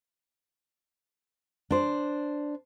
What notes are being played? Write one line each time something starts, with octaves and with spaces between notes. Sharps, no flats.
D4 C5